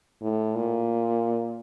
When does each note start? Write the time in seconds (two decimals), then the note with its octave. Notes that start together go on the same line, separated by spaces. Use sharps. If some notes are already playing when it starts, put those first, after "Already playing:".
0.21 A2
0.55 A#2